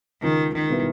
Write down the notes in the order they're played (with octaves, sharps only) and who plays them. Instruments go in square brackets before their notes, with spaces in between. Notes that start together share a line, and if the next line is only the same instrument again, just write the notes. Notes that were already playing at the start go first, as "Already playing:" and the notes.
[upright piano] C#2 [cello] D#3
[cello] D#3
[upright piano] B2 G3 B3 E4